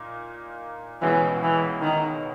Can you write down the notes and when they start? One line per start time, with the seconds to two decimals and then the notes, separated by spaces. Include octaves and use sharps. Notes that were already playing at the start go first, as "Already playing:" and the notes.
Already playing: A#2 A#3 D#4
1.02 C#2 B2 E3 G#3 C#4 F#4
1.43 E3
1.81 D#3